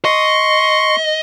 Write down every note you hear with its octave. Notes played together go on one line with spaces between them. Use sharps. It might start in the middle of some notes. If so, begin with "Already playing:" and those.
D#5 C6 C#6